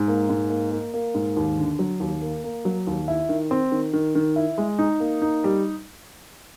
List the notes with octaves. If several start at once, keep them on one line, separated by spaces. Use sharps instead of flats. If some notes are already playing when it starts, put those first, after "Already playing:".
Already playing: G#2
A#3
G#2
A#3
A#3
A#3
G#2
D#2
D3
F#3
D#2
A#3
A#3
F#3
D#2
E4
D#3
C4
D#3
D#3
D#3
E4
G#3
D#4
A#3
D#4
G3